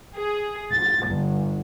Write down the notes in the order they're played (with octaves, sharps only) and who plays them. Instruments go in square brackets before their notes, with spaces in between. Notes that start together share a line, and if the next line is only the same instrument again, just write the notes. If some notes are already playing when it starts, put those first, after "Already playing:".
[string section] G#4
A6
G1